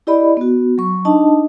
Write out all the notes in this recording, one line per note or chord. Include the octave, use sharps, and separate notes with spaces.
E4 G4 D5 D#5 B5
B3 F#4
F#3 C#6
D4 D#4 D#5 A5